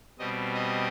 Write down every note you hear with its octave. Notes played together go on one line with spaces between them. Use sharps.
B2 G3 C4 D#5
D#5